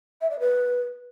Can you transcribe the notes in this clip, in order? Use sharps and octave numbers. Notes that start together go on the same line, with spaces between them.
E5
D5
B4